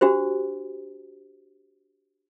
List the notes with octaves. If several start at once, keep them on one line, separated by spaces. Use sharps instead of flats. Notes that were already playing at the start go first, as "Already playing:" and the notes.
D4 F#4 G4 C5